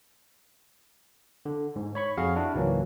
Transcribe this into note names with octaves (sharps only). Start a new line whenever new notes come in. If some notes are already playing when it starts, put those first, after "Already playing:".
D3
G#2
C#5 B5 C#6
F2 F#4 G#4 F5
D4 E4 F#4
C#2 G#2 E3 F#3 A#3